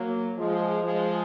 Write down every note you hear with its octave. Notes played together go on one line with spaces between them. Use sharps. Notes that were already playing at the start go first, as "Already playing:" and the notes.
Already playing: F#3 A#3
F3 G#3
F3 G#3